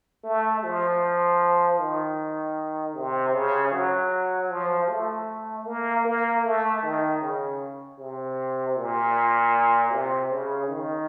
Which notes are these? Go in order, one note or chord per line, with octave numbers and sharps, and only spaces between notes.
A3
F3
D#3
C3
C#3
F#3
F3
A3
A#3
A#3
A3
D#3
C#3
C3
A#2
C3
C#3
D#3